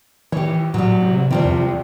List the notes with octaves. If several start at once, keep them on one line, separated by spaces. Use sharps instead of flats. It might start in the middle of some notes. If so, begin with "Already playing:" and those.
E3 G4 C#5
A2 F#3 G3
C3
C3 E3 F3 G3
E2